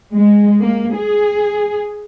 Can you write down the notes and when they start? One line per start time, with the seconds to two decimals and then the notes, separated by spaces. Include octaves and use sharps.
0.13 G#3
0.59 A#3
0.96 G#4